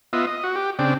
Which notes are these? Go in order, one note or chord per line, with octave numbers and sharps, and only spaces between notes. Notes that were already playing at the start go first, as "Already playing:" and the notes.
B3 F4 D#5 E5
D#5
F#4
G4
C#3 C4 D4 G5